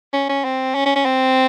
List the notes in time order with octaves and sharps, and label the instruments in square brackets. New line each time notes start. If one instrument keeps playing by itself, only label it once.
[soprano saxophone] C#4
C#4
C4
C#4
C#4
C#4
C4